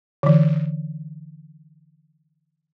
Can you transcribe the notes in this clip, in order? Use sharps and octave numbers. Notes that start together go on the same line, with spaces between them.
D3 E3